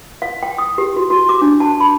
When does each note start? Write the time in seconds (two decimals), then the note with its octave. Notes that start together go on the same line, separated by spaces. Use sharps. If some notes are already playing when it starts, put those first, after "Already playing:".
0.22 F5
0.43 G5
0.58 D#6
0.78 G4
0.96 F#4
1.10 F#4
1.29 D6
1.42 D4
1.60 A5
1.80 B5